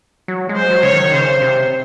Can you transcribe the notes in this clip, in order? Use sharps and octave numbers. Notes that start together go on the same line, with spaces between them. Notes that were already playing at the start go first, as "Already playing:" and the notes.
F#3
G#3
C5
F#3
C#3 C#5
D#3
C#3 C5
C3